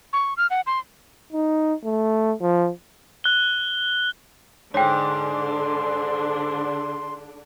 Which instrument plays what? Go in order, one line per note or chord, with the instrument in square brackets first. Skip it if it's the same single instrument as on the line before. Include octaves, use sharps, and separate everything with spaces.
[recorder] C#6
F6
F#5
C6
[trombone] D#4
A3
F3
[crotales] F#6 G7
[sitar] G#2 [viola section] D3 D4 [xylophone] C#5 G5 [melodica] C6